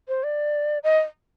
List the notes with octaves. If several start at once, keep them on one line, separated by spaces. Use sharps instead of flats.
C5
D5
D#5